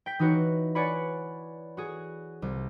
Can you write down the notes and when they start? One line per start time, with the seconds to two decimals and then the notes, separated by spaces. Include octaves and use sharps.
0.06 G5 B6
0.19 E3 D#4 E4 F#4 B4 C#5
0.75 B4 C#5 D5 F#5 G#5 B5
1.77 F#4 G#4
2.42 C2